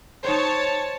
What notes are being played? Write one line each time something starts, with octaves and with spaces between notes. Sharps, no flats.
D#4 C5 C#5 A5